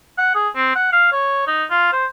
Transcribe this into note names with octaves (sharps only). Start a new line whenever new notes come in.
F#5
G#4
C4
F#5
F5
C#5
D#4
F4
C5